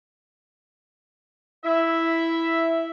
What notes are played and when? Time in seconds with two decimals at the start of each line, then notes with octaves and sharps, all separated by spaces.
1.64 E4 E5